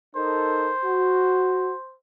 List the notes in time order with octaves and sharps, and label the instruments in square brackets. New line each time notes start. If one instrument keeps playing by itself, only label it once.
[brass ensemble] D#4 A4 A#4 [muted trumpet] C5
[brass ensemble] F#4